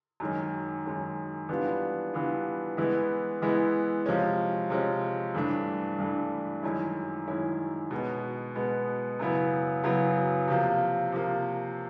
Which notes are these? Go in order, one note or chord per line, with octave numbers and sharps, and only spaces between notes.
F#2 D#3 G#3 C#4
F#2 D#3 G#3 C#4
E3 G3 B3 D4 F4
E3 G3 B3 D4 F4
E3 G#3 B3 E4
E3 G#3 B3 E4
C3 F3 G#3 C#4
C3 F3 G#3 C#4
G2 E3 A3 D4
G2 E3 A3 D4
F#2 D#3 G#3 C#4 E4
F#2 D#3 G#3 C#4 E4
B2 G#3 B3
B2 G#3 B3
F#2 C#3 F#3 B3 E4
F#2 C#3 F#3 B3 E4
C3 F3 A#3
C3 F3 A#3